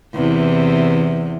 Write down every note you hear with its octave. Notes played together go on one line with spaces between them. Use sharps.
E2 C3 E3